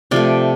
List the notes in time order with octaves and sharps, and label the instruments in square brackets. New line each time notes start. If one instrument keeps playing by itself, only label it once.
[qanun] C3 F3 A3 D5